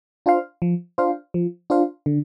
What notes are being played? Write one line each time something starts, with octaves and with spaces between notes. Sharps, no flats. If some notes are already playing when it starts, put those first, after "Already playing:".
D4 F4 C5 F5
F3
D4 F4 C5 F5
F3
D4 F4 C5 F5
D3